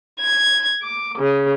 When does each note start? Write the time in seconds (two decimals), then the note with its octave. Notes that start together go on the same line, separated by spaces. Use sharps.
0.20 G#6
0.81 D6
1.19 C#3